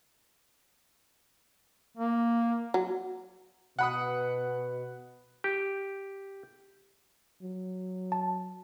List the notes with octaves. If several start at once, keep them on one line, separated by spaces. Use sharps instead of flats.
A#3
F#3
B2 F#5 B5 D#6
G4
F#3
A5